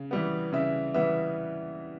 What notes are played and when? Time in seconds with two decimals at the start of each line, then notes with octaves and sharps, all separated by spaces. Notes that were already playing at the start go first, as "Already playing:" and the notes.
Already playing: C#3
0.11 E3 G3 B3
0.53 C#3 E5
0.94 E3 G3 B3 E5